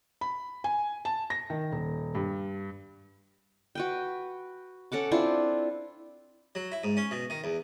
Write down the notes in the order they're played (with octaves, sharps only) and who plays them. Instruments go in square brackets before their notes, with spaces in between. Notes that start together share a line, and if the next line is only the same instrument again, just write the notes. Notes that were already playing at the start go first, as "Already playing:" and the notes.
[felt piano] B5
G#5
A5
A#6
D#3
D#1
G2
[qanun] F#4 B4 G5
C#4 A4 F#5 D6
C4 D4 E4 F4
[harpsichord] F#3
E4
G#2
C#4
B2
D#3
E2